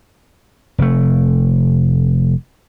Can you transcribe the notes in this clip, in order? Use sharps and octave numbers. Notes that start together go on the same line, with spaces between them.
F1 A3